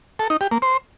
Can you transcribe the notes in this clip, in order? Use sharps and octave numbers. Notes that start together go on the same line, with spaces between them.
A4
D#4
G4
A#3
C5